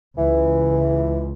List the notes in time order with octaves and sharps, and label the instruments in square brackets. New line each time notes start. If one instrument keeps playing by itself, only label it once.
[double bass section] C#2 [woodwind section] E3